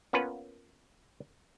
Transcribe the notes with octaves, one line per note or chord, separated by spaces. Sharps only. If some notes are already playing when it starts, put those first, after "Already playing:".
A#3 B3 C#4 F4 B4